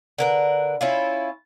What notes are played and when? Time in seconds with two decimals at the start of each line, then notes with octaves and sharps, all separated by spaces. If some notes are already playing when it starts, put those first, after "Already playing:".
0.18 D3 A#4 B4
0.81 C#4 E4 F4